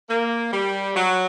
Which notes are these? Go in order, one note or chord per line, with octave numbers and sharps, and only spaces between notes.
A#3
G3
F#3